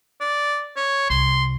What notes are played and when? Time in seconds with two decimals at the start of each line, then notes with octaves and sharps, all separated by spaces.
0.21 D5
0.76 C#5
1.10 C2 C6